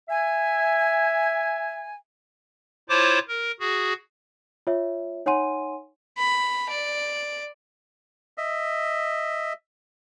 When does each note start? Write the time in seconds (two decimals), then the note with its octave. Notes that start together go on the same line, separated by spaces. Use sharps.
0.09 E5 G#5
2.89 E4 F4 C5 C#5 A5 D6
3.28 A#4
3.60 F#4 G#4
4.67 F4 C#5 E5
5.26 D#4 C#5 F#5 G#5 C6 D#7
6.18 B5
6.70 D5
8.38 D#5 E5